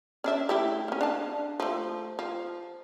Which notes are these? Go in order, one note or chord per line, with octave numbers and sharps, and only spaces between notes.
C#4 D4 E5
A3 E4 G4
A#3 C#4
D4 F5 A5
F3 A3
F3